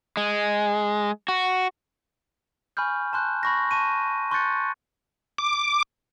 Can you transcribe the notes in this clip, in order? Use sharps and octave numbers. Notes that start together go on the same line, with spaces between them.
G#3
F#4
G#5 B5 C#6 F6 G6
A5 C6 F#6 G6
B5 C#6 A#6
A5 C#6 D#7
C6 C#6 F#6 G6 A6 C#7
D6